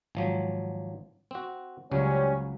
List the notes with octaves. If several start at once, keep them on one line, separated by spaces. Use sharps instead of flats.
G#1 F3 F#3
C4 F#4
C#2 C#3 F#3 G3 C4 C#4